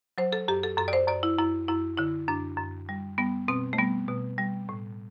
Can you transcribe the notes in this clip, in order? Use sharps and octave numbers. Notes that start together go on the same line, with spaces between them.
F#3 C5
A4
F#2 G4
A4
F#2 A4
D5
C5
F#2 D5
E4
F#2 E4
F#2 E4
D3 E4
F#2 D4
F#2
G3
G3 B3
B2 C4
A3
G3 B3
B2
G3
A2